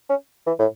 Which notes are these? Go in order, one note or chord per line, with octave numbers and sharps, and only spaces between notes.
C#4
E3
A2